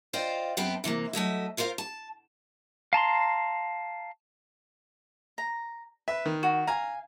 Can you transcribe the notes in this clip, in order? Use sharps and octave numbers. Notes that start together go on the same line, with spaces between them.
F4 C5 D5 D#5 F5 G5
F#2 B3 C4 C5 G5 A5
C3 E3 A3 A#3
F#3 A3 D#5 E5
E4 F4 A#4 C5 F5
A5
F5 A5 A#5 C6
A#5
B4 E5
D#3
F#4
F5 G#5 A#5